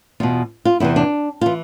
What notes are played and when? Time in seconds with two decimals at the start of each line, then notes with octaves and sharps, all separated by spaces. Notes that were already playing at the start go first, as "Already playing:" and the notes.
0.20 E2 B2 F4
0.65 F4
0.80 E2 C3 E3 E4
0.96 D4
1.41 E3 F4